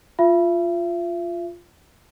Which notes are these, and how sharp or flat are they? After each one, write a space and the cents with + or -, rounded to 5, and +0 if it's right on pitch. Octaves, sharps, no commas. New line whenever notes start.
F4 +0 E5 +40